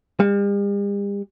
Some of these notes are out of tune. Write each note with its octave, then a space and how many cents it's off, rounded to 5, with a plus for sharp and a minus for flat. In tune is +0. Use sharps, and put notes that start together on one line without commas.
G3 +45